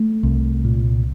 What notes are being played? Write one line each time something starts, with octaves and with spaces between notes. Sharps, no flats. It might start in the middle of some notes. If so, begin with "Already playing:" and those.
Already playing: A3
C2
A#2